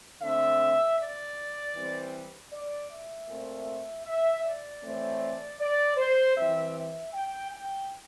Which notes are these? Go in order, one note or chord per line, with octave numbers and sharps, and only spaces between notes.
D3 A3 C4 E5
D5
E3 G3 C4
D5
E5
A#2 A3 C4
E5
D5
A2 E3 A3 C4
D5
C5
E3 G3 C4 E5
E5
G5
G5